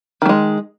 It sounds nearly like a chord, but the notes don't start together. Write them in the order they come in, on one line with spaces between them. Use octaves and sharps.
D#3 A3 G#3